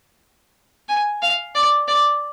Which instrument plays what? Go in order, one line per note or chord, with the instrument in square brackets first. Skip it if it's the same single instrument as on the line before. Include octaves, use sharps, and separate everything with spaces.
[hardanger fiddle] G#5
F5
D5
D5